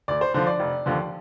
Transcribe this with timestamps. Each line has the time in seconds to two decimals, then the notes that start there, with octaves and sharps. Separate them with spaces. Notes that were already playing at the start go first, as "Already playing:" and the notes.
0.08 D2 D5
0.21 C5
0.34 D3 F3 C5
0.47 D5
0.60 F1
0.86 D#2 D3 F3